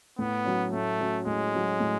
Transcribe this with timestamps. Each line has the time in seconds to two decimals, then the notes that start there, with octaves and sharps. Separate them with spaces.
0.19 A2 B3
0.45 F#3 C#4
0.72 A2 A3
1.00 F#3 C#4
1.26 A2 G#3
1.54 F#3 C#4
1.80 A2